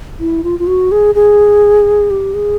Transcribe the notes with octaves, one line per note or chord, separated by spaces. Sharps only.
E4
F4
F4
F#4
G#4
G#4
G4
G#4